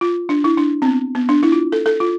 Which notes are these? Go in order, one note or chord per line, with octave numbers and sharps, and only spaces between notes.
F4
D4
E4
D4
C4
B3
B3
D4
E4
F4
A4
A4
F4